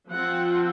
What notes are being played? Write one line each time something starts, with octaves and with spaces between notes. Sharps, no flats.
F3 C4 F4 F#5